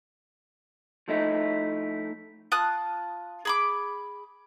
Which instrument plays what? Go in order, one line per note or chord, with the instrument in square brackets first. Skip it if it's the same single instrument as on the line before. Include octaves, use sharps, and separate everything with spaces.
[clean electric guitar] F3 A3 D#4 E4
[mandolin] F4 A5 D#6 F#6
G#4 B5 D6